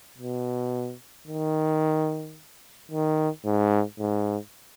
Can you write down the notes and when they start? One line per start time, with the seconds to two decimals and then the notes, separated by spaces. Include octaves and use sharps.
0.18 B2
1.27 D#3
2.91 D#3
3.45 G#2
3.99 G#2